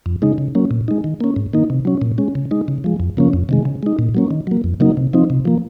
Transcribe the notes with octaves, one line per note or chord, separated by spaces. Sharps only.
F2
C#3 G#3 D#4
C#3
F#3 A#3 C#4
A#2
G#3 D#4
D#3
A#3 C#4
G#2
D#3 A#3 D#4
C3
F#3 C#4
A#2
G#3 C#4
C#3
G#3 D#4
C#3
F3 G#3
F2
C#3 F3 A#3 C#4
F2
C3 D#3 G#3
C#3
G#3 D#4
A#2
F#3 A#3 C#4
D#3
F#3 A#3
F2
C#3 F#3 A#3 D#4
C3
F3 C4 D#4
C3
F3 A#3